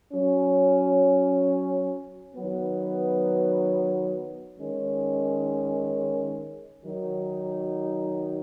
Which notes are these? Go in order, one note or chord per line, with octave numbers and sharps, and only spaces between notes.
F#3 C#4
D#3 F#3 B3
D#3 G#3 C#4
D#3 F#3 D#4